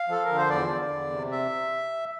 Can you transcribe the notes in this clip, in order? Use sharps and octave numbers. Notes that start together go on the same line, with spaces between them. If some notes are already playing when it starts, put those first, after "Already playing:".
Already playing: F5
F3 A4
A#4
D3
C5
E2 D5
D3
E2
C3
E5